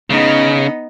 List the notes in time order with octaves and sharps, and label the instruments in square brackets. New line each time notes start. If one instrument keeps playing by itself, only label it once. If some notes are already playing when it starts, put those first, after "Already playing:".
[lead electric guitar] C#3 [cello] B3 D#4